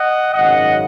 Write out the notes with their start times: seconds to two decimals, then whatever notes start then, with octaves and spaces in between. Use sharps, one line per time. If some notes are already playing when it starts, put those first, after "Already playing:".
Already playing: D#5 F#5
0.33 G#1 F#2 C#3 D#5 F#5